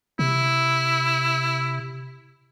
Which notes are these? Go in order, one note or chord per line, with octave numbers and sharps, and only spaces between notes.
C3 E4